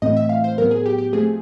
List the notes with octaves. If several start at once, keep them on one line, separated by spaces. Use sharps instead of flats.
A2 E3 A3 C4 D#5
E5
F5
C5
A2 F#3 B3 A#4
G#4
G4
G4
F3 A3 C4 G#4